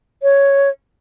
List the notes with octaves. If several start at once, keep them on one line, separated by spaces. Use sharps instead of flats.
C#5